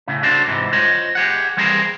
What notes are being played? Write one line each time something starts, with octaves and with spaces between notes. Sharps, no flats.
A2 C#3
D4 F#4 A4 C5
G#2 C3 E3
F4 C5 C#5 D#5
G4 G#4 F#5
E3 G3 C4 G#4 A#4 C5